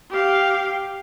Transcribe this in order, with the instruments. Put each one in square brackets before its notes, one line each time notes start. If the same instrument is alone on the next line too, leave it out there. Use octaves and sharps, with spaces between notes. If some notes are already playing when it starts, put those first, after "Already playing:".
[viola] G4 F5